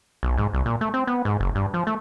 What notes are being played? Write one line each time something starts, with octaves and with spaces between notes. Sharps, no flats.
B1
G#2
C2
A#2
A3
C4
B3
G#2
F#1
G2
F3
A3